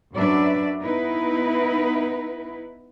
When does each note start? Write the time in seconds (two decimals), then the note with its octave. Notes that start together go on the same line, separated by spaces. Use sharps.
0.13 F#2 F#3 D4 B4 D5 E5
0.82 B3 D#4 E4 B4